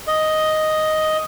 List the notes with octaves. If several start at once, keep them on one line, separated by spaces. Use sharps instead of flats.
D#5